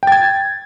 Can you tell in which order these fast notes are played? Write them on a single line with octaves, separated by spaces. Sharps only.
G5 A6 G#6